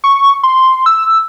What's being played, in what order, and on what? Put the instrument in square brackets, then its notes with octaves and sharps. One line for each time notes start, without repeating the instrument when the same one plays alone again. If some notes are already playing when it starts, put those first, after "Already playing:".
[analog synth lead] C#6
C6
E6